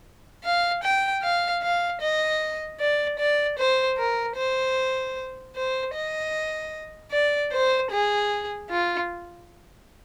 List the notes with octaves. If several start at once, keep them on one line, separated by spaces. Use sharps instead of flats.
F5
G5
F5
F5
D#5
D5
D5
C5
A#4
C5
C5
D#5
D5
C5
G#4
F4